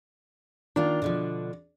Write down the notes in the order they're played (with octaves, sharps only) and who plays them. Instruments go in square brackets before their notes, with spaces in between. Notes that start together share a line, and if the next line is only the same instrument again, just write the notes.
[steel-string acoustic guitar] D#3 A#3 F4 [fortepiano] D4
[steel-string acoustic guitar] B2 D3 F3